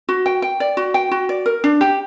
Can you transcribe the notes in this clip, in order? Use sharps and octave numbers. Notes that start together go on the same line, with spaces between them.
F#4
G5
G5
D5
F#4
G5
F#4
D5
A#4
D4
G4